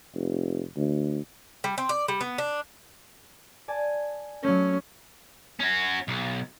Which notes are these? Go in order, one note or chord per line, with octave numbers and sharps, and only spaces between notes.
F1
D2
G3
C4
D5
G3
B3
D4
D5 G#5 A5
F#3 A3 C#4
C#4 F#4
B1